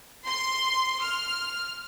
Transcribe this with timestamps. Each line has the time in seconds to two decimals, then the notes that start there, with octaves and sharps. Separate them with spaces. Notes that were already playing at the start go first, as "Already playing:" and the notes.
0.24 C6
1.02 F6